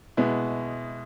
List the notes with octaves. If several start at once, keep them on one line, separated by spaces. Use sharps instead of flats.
B2 G#3 B3 E4